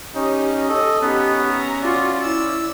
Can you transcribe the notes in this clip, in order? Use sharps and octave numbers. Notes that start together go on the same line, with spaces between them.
C#4 D#4 G4
A4 D#5
B3 C#4 D#4 G4
E5 A#5
F4 F#4 D5
E4 E6